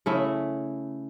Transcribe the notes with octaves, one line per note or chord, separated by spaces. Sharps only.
C#3 A3 E4